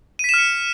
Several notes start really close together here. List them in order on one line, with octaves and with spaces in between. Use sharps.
D#7 B6 E7 F6 C#7